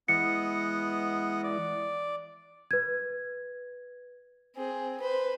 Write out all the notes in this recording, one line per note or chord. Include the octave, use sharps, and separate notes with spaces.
E3 G#3 B3 E4 D#5 F#5 C#7
D5
B4 G#6
C4 G#4
B4 C5